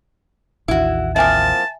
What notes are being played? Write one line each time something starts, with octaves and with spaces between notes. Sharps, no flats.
A1 D#2 E4 F#4
F3 A#3 C4 E5 G#5 A5